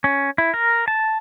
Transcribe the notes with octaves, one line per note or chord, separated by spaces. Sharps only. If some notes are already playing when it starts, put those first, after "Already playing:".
C#4
E4
A#4
A5